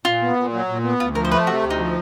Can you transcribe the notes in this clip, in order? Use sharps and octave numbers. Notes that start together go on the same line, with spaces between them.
A#2 F4
B3
A#2
F#3
A#2
B3
D2 F4
F3 A#4
C5
A3 B4
C3 F#4
D2
D#4
F3